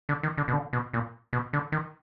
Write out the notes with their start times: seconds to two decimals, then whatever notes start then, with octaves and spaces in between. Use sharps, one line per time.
0.09 D3
0.23 D#3
0.38 D3
0.48 B2
0.53 D3
0.73 B2
0.93 A#2
1.33 B2
1.53 D3
1.72 D#3